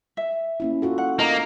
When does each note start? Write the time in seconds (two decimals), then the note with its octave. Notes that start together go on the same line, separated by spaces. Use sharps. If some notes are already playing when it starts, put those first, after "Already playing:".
0.17 E5
0.60 A#3 C#4 E4
0.82 F4 F#4 A4
0.98 F#5
1.19 A#3 D#4 D#5 A#5